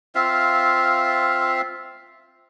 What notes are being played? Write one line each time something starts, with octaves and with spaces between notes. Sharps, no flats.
C4 F4 E5 F5